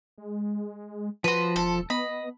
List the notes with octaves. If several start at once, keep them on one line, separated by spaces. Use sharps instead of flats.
G#3
F3 F#4 B4 C6
E1 A4
B3 D#5 B5